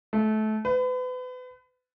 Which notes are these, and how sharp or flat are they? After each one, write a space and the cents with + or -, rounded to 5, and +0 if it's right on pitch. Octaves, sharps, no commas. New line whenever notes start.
A3 -25
B4 +35